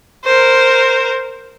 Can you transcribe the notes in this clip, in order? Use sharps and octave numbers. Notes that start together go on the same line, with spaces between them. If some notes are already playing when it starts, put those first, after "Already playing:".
A#4 C5